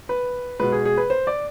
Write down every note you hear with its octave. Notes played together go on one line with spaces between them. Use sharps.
B4
B2 G#3 B4
G#4
G#4
B4
C5
D5